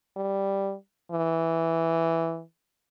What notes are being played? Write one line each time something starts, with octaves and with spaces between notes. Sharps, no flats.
G3
E3